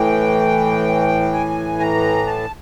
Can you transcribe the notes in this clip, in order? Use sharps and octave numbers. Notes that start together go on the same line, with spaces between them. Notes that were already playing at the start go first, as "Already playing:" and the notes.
Already playing: A2 E3 G5
G#5
A#5
A5